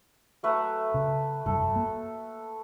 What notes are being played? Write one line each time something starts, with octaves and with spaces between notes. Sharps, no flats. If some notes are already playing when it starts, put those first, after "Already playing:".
F#3 A3 B4
C#3
F1 G2 A4
A#3